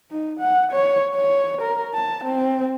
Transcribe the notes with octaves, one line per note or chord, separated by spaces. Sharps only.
D#4
F#5
C#5
C#5
A#4
A5
C4